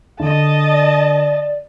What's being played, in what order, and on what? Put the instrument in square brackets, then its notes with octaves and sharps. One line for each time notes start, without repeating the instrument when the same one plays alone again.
[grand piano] D3 [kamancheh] D#5 A5
[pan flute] D5